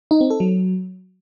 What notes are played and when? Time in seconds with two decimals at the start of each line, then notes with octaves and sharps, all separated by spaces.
0.11 D#4
0.21 C4
0.30 A4
0.40 F#3